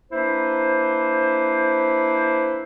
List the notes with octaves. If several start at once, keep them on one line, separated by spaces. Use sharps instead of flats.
A#3 D4 E4 B4 C5